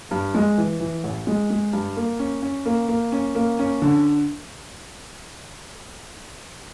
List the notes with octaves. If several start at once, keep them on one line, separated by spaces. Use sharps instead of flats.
G2
G#3
E3
E3
A1
G#3
G#3
G2
A#3
C#4
C#4
A#3
A#3
C#4
A#3
C#4
D3